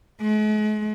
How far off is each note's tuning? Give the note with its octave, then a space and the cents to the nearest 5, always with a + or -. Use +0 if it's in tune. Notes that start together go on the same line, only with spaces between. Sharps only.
G#3 +45